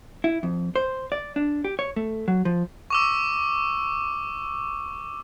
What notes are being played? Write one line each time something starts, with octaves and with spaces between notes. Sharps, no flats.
E4
F2
C5
D5
D4
G4
C#5
A3
F#3
F3
C#6 D6 E6